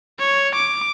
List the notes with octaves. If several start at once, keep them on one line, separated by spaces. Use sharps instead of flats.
C#5
D6